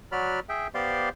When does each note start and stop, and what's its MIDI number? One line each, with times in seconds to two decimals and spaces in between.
0.12 0.40 54
0.12 0.40 66
0.12 0.40 74
0.12 0.40 83
0.12 0.40 89
0.49 0.67 68
0.49 0.67 76
0.49 0.67 79
0.75 1.09 59
0.75 1.09 67
0.75 1.09 72
0.75 1.09 74
0.75 1.09 77
0.75 1.09 84